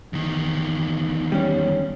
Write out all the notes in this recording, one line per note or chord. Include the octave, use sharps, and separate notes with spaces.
E2 D#3
G3 C#4